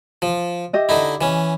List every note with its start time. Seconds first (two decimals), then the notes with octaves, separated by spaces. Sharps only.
0.22 F3
0.73 G4 D#5 E5
0.89 D3 D#4 E4
1.21 E3 C#4